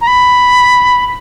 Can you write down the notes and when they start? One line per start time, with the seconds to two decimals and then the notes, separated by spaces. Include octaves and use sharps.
0.01 A#5
0.07 B5